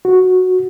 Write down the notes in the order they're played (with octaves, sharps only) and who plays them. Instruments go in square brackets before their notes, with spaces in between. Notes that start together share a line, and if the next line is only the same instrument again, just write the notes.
[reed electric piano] F#4